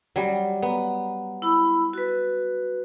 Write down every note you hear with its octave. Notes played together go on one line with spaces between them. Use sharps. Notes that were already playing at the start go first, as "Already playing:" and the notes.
F#3 G3
B3 A#5
E4 B5 E6
F#4 B4